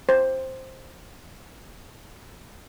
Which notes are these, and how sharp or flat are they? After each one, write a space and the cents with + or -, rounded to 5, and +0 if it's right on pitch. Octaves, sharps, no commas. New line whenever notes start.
C5 +5